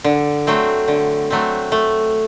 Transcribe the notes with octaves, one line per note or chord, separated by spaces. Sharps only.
D3
F#3 A3 C4
D3
F#3 A3 C4
A3